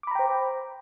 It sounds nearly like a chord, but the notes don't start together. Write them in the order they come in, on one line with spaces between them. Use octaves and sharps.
D6 B5 A#5 G5 C5